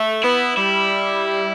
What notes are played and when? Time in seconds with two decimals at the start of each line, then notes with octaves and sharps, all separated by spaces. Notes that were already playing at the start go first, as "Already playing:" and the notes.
Already playing: A3
0.24 B3 E4
0.57 G3 E4